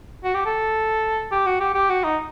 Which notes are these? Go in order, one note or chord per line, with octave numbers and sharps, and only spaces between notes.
F#4
G4
A4
G4
F#4
G4
G4
F#4
D#4